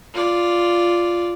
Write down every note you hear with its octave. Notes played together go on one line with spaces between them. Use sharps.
F4 D5